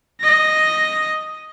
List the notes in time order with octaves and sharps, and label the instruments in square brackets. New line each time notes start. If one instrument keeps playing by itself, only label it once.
[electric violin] D#5 A#6